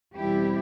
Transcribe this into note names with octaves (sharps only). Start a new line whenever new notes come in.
E2 B2 G3 C4 E4 G4